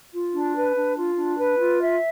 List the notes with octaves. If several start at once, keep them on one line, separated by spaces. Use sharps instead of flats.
F4
D4
B4
D4
F4
D4
B4
F4
E5